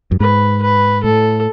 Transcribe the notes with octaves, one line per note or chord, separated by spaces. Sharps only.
F#2
G#2 B4
B4
A2 A4